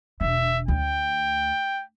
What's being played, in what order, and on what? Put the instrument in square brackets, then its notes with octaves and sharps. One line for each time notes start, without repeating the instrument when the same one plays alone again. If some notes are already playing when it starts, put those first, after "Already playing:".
[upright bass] E1 D3 [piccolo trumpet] E5
[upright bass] D2 [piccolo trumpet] G5